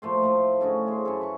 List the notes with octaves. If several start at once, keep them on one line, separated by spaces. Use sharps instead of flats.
A#2 F3 A3 C6
A2 F3 A3
D3 A3 C#4 D#4
C#4 G#4 C5
F#2 E4 A4
B4 C#6